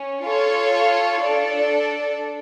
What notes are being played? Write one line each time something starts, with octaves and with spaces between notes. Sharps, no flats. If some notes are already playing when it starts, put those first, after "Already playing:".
Already playing: C#4
F4 A4 C#5 F5
D4 A4 D5